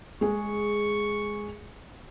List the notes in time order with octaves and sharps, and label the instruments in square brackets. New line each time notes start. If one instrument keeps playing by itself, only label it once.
[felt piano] G#3 G#4 [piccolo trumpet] C#6